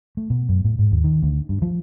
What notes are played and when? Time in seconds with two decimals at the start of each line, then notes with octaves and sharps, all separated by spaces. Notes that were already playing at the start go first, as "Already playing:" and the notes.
0.17 A3
0.30 B2
0.49 F#2
0.65 A2
0.79 G#2
0.92 D#2
1.04 D#3
1.23 D2
1.49 G2
1.62 F3